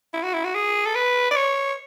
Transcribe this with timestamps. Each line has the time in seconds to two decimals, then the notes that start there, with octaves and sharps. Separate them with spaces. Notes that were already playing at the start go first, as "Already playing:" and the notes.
0.13 E4
0.23 F#4
0.34 E4
0.45 F#4
0.55 G#4
0.86 A4
0.95 B4
1.31 D5
1.36 C#5